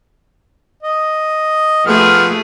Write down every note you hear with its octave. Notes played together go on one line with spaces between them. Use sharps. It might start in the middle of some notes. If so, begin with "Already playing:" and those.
D#5
F3 A3 B3 G#4 F6